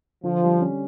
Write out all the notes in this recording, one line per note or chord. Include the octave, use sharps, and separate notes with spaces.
D3 F3
G3
C#4